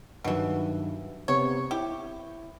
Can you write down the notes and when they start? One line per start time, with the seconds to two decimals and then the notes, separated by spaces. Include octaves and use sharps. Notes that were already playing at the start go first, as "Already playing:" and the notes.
0.24 G2 B2 D#3 E3 F#3
1.28 C3 B3 C#5
1.71 E4 G4